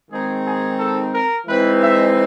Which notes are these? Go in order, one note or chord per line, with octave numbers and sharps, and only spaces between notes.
D#3 G#3 C4 D#4 G#4
G#4
A4
A#4
E3 G#3 C4 D#4 B4
E5